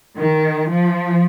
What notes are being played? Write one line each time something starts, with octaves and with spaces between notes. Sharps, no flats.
D#3
F3